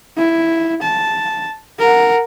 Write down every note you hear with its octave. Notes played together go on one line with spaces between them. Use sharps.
E4
A5
A#4 F#5